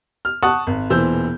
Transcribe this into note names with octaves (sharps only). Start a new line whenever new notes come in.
F6
F#5 A5 C#6 D#6 F#6
G#1
E1 A#2 E3 C5 E6 G6